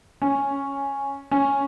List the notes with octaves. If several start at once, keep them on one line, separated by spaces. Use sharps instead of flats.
C#4
C#4